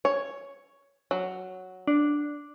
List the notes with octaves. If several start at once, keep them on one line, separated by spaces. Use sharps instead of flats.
C#5
F#3
D4